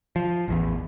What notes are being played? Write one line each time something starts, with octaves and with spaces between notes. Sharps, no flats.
F3
A1 E2